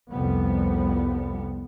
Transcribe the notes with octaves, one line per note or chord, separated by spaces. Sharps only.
C2 F2 F3 G3 B3